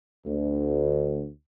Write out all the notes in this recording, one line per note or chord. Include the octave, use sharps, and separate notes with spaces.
D2